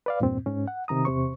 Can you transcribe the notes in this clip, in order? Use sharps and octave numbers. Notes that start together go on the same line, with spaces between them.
B4 D5 F5
E2 G2 A#2 C4
G#2 C#4
F#5
C3 D#3 A#5 D#6
E2 C3 C5 C#6